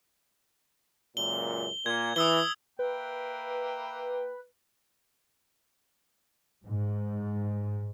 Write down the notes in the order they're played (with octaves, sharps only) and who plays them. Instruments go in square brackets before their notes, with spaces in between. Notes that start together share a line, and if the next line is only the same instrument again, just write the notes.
[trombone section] C#2 F#2 A#2 [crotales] G7
[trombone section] A#2 [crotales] G#6
[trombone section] E3 [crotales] D#6 E6 G7
[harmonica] A#3 E5 G5 [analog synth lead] B4
[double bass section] G#2